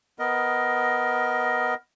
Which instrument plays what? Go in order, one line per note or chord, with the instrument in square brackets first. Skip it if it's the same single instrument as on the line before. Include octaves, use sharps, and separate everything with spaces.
[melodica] B3 A#4 D#5